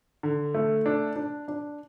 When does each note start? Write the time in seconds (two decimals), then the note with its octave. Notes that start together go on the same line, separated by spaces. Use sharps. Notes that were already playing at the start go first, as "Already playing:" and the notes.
0.23 D3
0.55 A3
0.86 D4
1.16 D4
1.48 D4